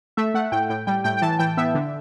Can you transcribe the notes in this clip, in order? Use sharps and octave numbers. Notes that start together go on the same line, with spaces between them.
A3 E5
A3 F#5
A2 G5
A2 G5
G3 G5
A2 G5
G5
E3 A5
E3 G5
B3 E5
D3